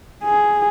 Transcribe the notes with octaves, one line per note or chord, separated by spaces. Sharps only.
G#4